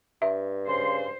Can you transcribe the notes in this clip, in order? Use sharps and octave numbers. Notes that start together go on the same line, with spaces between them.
G2 E5
C#3 C5 C6